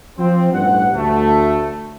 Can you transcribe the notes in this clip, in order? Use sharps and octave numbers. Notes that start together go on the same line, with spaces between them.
F3 C4
A1 G2 G3 F#5
D2 A3